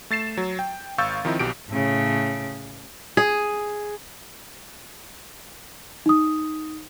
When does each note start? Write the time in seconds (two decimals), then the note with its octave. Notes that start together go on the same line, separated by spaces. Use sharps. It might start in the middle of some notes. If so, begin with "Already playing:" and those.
0.10 A3 A6 C7 E7
0.37 F#3
0.59 G5
0.98 G#1 F5 C#6 E6 G6 A6
1.25 D#3 F3 C4 D#4 E4
1.39 B1 B2 G4 D7
1.70 A2 C#3
3.17 G#4
6.06 D#4 D#6